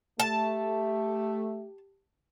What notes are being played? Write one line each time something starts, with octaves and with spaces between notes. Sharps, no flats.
A3 G4 A5